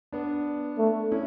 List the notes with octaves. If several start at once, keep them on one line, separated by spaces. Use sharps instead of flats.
B3 D4
A3
C#4 E4